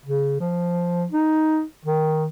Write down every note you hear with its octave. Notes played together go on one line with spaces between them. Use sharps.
C#3
F3
D#4
D#3